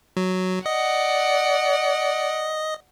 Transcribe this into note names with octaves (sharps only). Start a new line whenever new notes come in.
F#3
D5 D#5 F#5